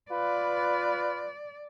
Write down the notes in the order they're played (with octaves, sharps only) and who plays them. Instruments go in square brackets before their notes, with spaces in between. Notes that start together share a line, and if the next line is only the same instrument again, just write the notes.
[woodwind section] F4 B4 [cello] D5